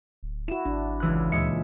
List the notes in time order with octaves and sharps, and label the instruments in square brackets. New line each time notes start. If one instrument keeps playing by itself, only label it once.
[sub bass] D1
[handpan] E4 F#4 [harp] E7
[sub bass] G#1 [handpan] D4
[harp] C#2 E3 F#6
[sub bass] D2 [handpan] A#2 E5 [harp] G#3 C#7